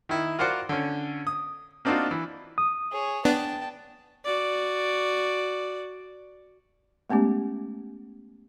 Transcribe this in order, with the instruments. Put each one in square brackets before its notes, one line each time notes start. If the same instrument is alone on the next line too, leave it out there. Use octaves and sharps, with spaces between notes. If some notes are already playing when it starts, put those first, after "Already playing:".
[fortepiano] D#3 E4
F4 F#4 A#4 C5 D5 F#5
D3 C#4
D#6
A#3 C4 D4 D#4 F4 F#4
E3
[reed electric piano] D#6
[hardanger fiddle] G#4 C#5
[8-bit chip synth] B3 D4 [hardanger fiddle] G5 A5
[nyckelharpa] F#4 D5
[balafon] G#3 A3 B3 C#4 G4